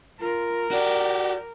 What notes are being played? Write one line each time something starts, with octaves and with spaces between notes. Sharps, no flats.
F4 A#4
F#4 G4 D5